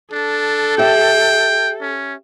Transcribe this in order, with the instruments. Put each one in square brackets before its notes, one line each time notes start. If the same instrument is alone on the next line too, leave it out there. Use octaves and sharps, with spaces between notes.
[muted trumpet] D4 [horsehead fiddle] A4
[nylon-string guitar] G4 E5 [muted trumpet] G5
[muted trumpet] C#4